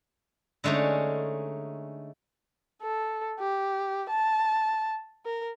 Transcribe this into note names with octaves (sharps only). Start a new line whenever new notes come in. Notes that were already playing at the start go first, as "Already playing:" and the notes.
D3 G#3 A3 C#4 D#4
A4
G4
A5
A#4